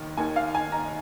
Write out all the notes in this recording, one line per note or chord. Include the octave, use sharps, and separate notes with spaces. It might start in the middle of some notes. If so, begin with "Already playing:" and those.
Already playing: D#2 D#3
D#2 D#3 G#5
F5
G#5
A#5